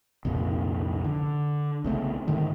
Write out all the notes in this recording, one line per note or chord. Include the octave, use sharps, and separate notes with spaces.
C2 F2 A#2 C#3
D3
C2 C#3 A3 B3
G#2 D3 D#3 A3